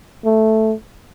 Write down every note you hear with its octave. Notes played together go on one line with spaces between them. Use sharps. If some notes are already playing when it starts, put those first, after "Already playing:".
A3